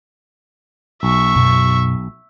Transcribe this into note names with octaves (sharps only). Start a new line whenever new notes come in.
B1 E5 C#6
F#2 B2